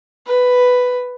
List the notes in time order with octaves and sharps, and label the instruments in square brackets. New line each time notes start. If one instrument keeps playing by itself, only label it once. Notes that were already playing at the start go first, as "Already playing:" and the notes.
[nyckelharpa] B4